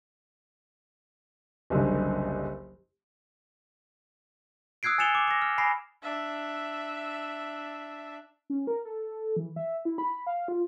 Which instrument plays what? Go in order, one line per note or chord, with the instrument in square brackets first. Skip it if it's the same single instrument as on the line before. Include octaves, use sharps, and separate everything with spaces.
[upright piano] F#1 C2 F#2 D3
[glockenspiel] D#6 E6 F#6 G#6 C7 D7
G#5 A6 C#7 E7 F7 G7
D6
D6 A#6
F6
G#5 B5 A#6 C7
[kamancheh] D4 E5
[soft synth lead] C#4
A#4
A4
E3
E5
E4
B5
F5
F4